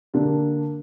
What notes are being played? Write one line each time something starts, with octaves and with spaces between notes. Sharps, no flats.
D3 A#3 D4 G4